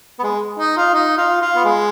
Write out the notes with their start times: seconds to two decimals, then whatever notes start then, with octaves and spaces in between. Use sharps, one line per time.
0.19 B3
0.24 G#3
0.59 D#4
0.77 F4
0.94 D#4
1.18 F4
1.42 F4
1.55 B3
1.65 G#3